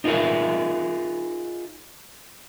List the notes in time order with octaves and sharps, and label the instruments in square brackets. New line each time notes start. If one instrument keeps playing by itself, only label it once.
[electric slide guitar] D#4 F4 G#4 A#4 B4 E5